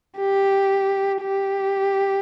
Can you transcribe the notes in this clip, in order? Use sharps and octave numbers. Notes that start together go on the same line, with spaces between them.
G4
G4